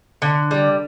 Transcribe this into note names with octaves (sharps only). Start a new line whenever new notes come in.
D3
G3